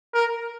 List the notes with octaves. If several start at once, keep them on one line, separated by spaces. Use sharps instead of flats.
A#4